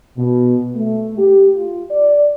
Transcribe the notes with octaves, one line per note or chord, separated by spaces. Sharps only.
B2
A3
G4
F4
D5